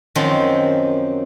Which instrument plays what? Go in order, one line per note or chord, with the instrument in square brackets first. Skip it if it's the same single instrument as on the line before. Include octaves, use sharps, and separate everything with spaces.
[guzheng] F#2 D#3 F3 F#3 C4